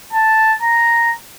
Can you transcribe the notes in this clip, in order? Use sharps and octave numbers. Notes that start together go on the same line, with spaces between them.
A5
A#5